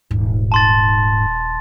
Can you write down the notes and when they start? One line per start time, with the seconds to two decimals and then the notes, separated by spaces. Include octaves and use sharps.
0.11 D#1 G#2
0.52 A5 C6 A6